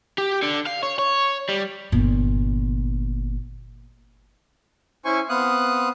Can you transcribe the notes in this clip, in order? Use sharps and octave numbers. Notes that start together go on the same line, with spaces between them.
G4
D3
F5
C#5
C#5
G3
G1 A#2
C#4 E4 C5 G#5 C#6
B3 C4 F5 D#6 F#6